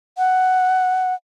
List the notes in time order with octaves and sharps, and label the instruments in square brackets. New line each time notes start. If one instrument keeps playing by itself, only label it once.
[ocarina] F#5